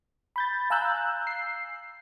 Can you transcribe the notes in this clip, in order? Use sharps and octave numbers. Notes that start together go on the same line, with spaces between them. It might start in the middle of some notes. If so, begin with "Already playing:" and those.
B5 G6 A6
F5 G#5 A#5 E6 F#6 G6
C7